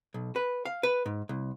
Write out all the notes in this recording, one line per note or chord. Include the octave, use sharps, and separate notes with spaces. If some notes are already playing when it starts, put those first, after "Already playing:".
B1
B4
F5
B4
G#2
C2